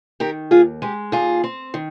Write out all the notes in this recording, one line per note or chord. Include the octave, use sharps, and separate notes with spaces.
D#3 G4 A#4
D#2 F4 G#4
G#3 G4
D#2 F4 G#4
C4
D#3